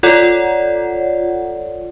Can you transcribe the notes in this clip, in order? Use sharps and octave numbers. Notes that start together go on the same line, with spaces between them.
F4 A4 C#5 D5 F#5